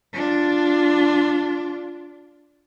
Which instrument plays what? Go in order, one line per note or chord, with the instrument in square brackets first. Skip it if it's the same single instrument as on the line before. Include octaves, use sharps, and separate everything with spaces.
[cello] D4 F4